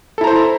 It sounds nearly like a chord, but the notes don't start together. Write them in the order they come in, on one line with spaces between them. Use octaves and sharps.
A4 E4 A#5 C5